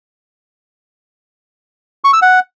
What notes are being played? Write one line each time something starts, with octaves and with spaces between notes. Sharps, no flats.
C#6
E6
F#5